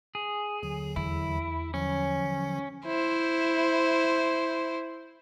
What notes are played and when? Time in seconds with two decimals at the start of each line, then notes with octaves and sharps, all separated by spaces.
0.15 G#4
0.63 D#2 D3 F#3
0.96 E2 E4
1.74 D3 F3 F#3 C#4
2.86 E4 C5